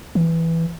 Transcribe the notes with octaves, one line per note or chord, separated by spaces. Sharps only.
E3